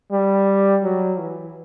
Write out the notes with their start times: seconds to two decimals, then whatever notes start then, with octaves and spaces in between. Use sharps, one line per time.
0.12 G3
0.84 F#3
1.19 E3